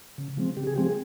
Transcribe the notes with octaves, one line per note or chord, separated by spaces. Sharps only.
C#3
F3 G#3 C4
C#3 G4
G#4
F3 G#3 C4 G4
G#4